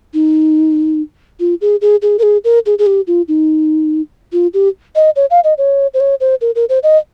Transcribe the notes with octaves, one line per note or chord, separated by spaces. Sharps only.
D#4
F4
G#4
G#4
G#4
A#4
G#4
A#4
G#4
G#4
G4
F4
D#4
F4
G4
D#5
C#5
F5
D#5
C#5
C5
C#5
C5
A#4
A#4
C5
D#5